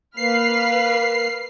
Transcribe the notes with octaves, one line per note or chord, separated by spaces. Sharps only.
A#3 B4 B5 F6 C7